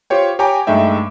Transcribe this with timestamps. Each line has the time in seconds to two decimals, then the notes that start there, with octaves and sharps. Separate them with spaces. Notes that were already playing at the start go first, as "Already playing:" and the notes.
0.10 F4 G4 C5 C#5 G5
0.39 G4 C#5 G5 G#5 A#5 D6
0.67 G2 G#3 A3 D#4 E5 G5